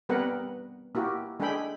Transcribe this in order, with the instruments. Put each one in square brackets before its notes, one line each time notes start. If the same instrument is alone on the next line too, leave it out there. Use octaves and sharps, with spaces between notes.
[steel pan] G3 B3 C4 A#4 B4 F#5
A#3 E4 F#4 G4
G#3 D4 G#4 A4 G5 B5